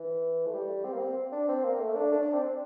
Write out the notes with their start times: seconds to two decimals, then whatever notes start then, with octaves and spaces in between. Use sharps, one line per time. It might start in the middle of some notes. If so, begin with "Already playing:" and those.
Already playing: E3
0.47 A3
0.54 G3
0.85 C4
0.93 A#3
1.00 C4
1.32 D4
1.48 C4
1.64 A#3
1.80 A3
1.96 D4
2.12 D4
2.22 D4
2.33 C4